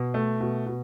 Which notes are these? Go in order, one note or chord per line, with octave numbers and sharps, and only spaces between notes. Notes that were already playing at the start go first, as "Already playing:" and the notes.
Already playing: B2
A3
B2
B2